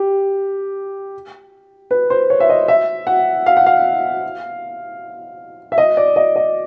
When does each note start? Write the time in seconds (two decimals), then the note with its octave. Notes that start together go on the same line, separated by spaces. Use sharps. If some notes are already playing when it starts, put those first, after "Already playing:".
Already playing: G4
1.91 B4
2.10 C5
2.30 C#5
2.40 E5
2.49 D#5
2.68 E5
3.07 F#5
3.46 F5
3.57 F#5
3.67 F5
5.72 E5
5.78 D#5
5.97 D5
6.16 D#5
6.36 D#5